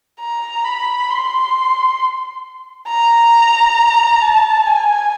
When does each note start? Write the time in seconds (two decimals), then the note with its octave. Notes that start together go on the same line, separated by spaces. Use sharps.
0.20 A#5
0.65 B5
1.09 C6
2.88 A#5
4.22 A5
4.66 G#5